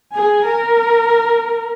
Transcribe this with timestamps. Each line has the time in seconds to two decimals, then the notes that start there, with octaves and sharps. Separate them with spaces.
0.12 G#4 G#5
0.45 A#4